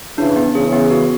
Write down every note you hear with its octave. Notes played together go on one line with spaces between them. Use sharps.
C#3 E3 D4
B3
C#3 E3 G#4
B3
F#4